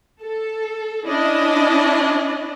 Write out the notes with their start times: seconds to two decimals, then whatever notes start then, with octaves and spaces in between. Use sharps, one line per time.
0.22 A4
1.07 C#4 D4 E4 D#5